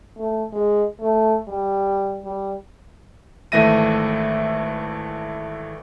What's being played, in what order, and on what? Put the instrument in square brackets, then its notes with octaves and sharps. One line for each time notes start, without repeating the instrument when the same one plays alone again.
[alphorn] A3
G#3
A3
G3
G3
[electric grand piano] G#1 E3 A3 E5 A#6 D#7